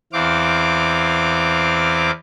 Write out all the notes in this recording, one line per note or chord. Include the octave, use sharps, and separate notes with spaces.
E2 E3 C4 F5 D6